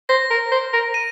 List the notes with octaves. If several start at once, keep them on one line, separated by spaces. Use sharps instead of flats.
C5 A#6
A#4
C5
A#4
D#7